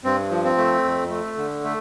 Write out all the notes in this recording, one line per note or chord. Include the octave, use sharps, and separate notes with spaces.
G2 C4
F3
C4
A3
F2
A3
D3
A3